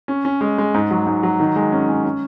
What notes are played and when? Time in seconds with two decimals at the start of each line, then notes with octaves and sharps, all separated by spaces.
0.08 C#4
0.25 C#4
0.41 G#3
0.58 G#3
0.74 G#2
0.91 F#3
1.06 G#2
1.23 F#3
1.40 D#3
1.56 G#3
1.72 C#4
1.89 C#4
2.04 C#4